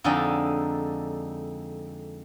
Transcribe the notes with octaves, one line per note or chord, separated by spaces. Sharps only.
F2 D3 G#3 D#4